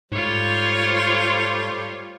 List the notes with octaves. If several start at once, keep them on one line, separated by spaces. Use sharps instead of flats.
G#2 G3 A3 F4 C5 C#5